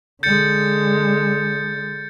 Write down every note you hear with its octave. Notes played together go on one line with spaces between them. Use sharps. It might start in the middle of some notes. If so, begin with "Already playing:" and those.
D3 G#3 G6 A6 C#7